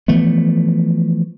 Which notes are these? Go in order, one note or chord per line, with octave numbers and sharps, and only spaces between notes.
E3 F3 A3 B3